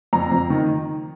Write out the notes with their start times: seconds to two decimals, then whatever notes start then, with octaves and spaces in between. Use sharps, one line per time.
0.13 F2 A#5
0.32 F2
0.50 D#3